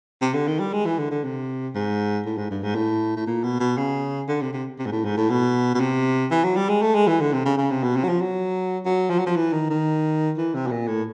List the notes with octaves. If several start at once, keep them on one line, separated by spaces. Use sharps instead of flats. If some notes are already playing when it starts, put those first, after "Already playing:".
C3
D3
D#3
G3
G#3
E3
D3
D3
C3
G#2
A2
G#2
G2
G#2
A2
A2
A#2
B2
B2
C#3
D3
C3
C3
C3
G#2
A2
G#2
A2
B2
B2
C3
E3
F#3
G3
G#3
A3
G#3
E3
D3
C3
C#3
C#3
C3
B2
C3
F#3
F3
F#3
F#3
F3
F#3
F3
E3
D#3
D#3
E3
C3
B2
A#2
A2